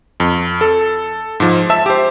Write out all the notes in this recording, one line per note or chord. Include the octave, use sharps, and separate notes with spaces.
F2
A4
G#2 F3
E5 A5 E6
G4 C5